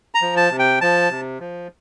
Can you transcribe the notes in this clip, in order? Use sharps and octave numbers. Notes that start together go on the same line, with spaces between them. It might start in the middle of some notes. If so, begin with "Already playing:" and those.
A#5
F3
A5
C3
G5
F3 A5
C3
F3